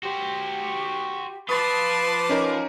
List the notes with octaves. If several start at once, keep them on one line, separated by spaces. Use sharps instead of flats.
F#4 G4 C5
F3 F4 B4 A5 C6 D6 D#6 A6
C#4 D#4 A#4